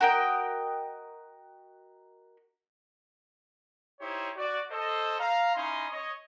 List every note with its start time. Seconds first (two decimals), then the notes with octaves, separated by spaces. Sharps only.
0.01 F#4 A#4 D#5 G5
4.00 D#4 E4 G4 C5 C#5
4.36 F#4 D5
4.70 A4 C5 D#5
5.19 F5 A#5
5.55 C#4 D#4 E4 D#5 C6 D#6
5.91 C#5 D#5